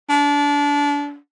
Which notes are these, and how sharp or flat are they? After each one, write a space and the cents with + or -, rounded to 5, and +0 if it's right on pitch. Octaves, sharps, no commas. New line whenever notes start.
D4 -25